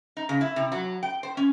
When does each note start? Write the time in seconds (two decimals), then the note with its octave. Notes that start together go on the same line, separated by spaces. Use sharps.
0.17 D#4
0.29 C#3
0.41 E4
0.56 C3
0.72 F#3
1.03 G5
1.23 C5
1.37 C#4